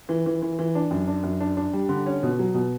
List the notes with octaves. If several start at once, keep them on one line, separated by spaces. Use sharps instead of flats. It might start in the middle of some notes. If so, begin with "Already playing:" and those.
E3
E3
E3
E3
D4
F#2
D4
F#2
D4
D4
G3
D3
C#4
B2
F#3
B2